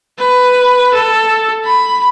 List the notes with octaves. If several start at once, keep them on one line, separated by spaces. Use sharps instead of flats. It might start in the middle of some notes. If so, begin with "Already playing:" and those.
B4
A4
B5